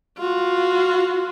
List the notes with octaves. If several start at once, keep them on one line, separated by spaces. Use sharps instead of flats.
F4 F#4